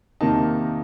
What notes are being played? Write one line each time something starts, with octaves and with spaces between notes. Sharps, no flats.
C3 D#3 A#3 D#4 A5